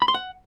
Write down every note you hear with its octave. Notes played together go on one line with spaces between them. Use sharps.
B5
C6
F#5